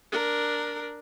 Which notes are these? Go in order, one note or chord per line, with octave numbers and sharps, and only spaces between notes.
D4 A#4